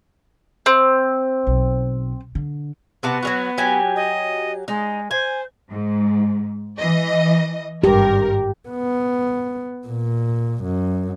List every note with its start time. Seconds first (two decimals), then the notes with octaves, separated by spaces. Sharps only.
0.66 C4
1.47 B1
2.35 D3
3.03 C3 B3 F#4 A5
3.23 F#3 G#3 F#4
3.58 F#3 G4 G#5
3.96 D#5
4.68 G#3 D#4
5.11 C5 G#5
5.72 G#2
6.77 E3 D#5
7.84 G#1 G2 G4 A#4
8.69 B3
9.87 A#2
10.64 F#2